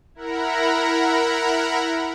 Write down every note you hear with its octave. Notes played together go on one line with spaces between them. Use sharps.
E4 A#4 F#5 A#5 B5